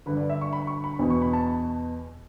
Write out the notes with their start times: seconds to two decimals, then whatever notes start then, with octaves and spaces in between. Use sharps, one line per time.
0.06 G2 D3 B4
0.17 D5
0.30 E5
0.41 C#6
0.53 B5
0.67 C#6
0.84 B5
0.99 E2 B2
1.10 C#6
1.22 B5
1.33 A5